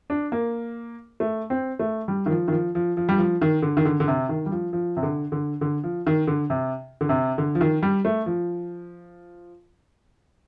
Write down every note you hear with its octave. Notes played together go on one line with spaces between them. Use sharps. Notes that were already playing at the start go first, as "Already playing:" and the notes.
D4
A#3
A3
C4
A3
G3
D#3
F3
D#3
F3
F3
F3
G3
F3
D#3
D3
D#3
D3
D3
C3
D#3
G3
F3
F3
C3
D3
D3
D3
F3
D#3
D3
C3
D3
C3
D3
F3
D#3
G3
A3
F3